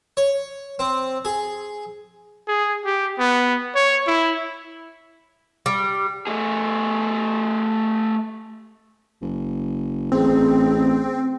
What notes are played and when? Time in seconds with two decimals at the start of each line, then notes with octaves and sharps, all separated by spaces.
0.17 C#5
0.79 C4
1.25 G#4
2.48 G#4
2.85 G4
3.19 B3
3.75 C#5
4.07 E4
5.66 G3
6.27 A3 G#4
9.22 F#1
10.12 A1 C4 G#4